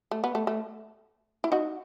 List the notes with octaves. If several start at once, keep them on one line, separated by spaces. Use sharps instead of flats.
A3
B3
A3
A3
E4
D#4 F#4